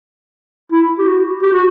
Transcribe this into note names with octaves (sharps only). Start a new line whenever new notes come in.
E4
G4
F#4
G4
F#4